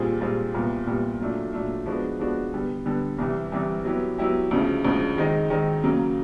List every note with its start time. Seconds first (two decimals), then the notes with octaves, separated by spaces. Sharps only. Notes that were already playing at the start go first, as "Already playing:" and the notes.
Already playing: A#2 G3 C4 F4 G#4
0.21 A#2 G3 C4 F4 G#4
0.54 C2 A#2 G3 B3
0.87 C2 A#2 G3 B3
1.20 A#2 F#3 A3 D4
1.53 A#2 F#3 A3 D4
1.86 F3 G#3 B3 D4 F#4
2.19 F3 G#3 B3 D4 F#4
2.53 D3 G3 B3
2.86 D3 G3 B3
3.18 C2 C3 E3 G3
3.52 C2 C3 E3 G3
3.85 F#3 B3 E4 G4
4.18 F#3 B3 E4 G4
4.51 D2 C#3 F3 G#3
4.85 D2 C#3 F3 G#3
5.18 D#3 G#3 C4 D#4
5.50 D#3 G#3 C4 D#4
5.84 C#3 F#3 A#3